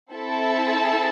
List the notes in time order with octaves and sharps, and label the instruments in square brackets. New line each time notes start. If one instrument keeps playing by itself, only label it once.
[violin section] C4 E4 A4 E5 A5